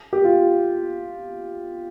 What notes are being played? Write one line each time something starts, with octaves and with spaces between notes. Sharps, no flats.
G4
F4